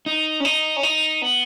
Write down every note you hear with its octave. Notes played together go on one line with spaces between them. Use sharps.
D#4
C#4
D#4
C#4
D#4
B3